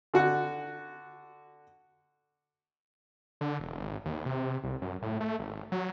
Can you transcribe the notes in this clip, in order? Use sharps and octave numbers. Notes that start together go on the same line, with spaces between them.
D3 F#4 F#5
D3
E1
G#1
D#2
C3
C2
F#2
A2
A3
G#1
F#3